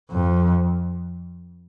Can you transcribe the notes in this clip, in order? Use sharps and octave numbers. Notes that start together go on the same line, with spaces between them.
F2